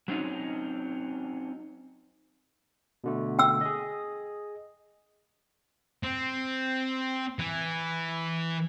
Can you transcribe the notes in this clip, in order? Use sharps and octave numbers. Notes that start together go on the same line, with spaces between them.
F#3 C4 C#4 D#4 F#4
B2 D3 A3
G5 E6
G#4 D#5
C4
E3